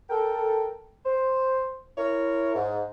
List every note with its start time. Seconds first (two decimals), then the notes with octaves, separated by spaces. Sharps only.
0.10 A4 A#4 G5
1.05 C5
1.98 E4 A#4 C#5
2.55 G#2